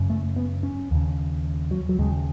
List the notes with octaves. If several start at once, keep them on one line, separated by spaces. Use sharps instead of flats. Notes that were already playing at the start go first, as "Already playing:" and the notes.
Already playing: F#2 C#3
A3
B3
C#4
D#2 C#3
F#3
F#3
D#2 C#3 G#3